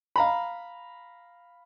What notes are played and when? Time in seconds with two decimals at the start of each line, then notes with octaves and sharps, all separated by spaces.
0.16 F5 A#5 B5